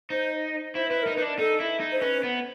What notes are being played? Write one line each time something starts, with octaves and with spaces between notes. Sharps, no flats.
D#4 C5
E4 C5
E4 B4
D#4 A#4
D#4 B4
D4
D#4 A4
E4
D#4
C5
C#4 B4
B3